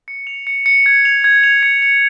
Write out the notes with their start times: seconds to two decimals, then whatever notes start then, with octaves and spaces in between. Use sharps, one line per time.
0.08 C#7
0.27 F7
0.47 C#7
0.66 C#7
0.86 G#6
1.05 F7
1.24 G#6
1.44 F7
1.63 C#7
1.82 C#7